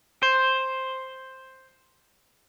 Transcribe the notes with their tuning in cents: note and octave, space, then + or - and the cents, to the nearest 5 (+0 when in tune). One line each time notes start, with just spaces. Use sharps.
C5 +5